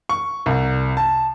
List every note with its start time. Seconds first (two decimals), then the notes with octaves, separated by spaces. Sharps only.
0.09 C#6
0.46 C2
0.97 A5